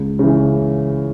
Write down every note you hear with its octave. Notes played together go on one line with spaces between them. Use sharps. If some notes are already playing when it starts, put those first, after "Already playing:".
Already playing: C#2
C#3 E3